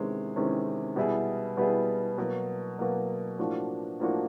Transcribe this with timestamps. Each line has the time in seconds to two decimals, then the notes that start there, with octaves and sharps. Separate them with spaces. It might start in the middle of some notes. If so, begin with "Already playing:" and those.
Already playing: E2 C3 D#3 G#3 C#4
0.36 E2 C3 D#3 G#3 C#4
0.96 B2 G3 B3 E4 G#4
1.57 B2 G3 B3 E4 G#4
2.18 B2 F#3 A#3
2.79 B2 F#3 A#3
3.38 A2 F3 A#3 D4 F#4
4.00 A2 F3 A#3 D4 F#4